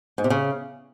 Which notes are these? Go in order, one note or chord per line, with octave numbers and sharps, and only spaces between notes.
G#2
C3
C#3